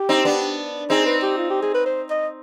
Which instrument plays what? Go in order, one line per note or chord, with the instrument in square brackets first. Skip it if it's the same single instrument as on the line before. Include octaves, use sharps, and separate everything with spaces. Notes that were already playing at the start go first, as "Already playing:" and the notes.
Already playing: [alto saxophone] G4
[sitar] C4 D#4
B3 D4
[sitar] C4 D#4 [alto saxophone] G#4
[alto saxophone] B4
G4
F4
G4
G#4
B4
C5
D#5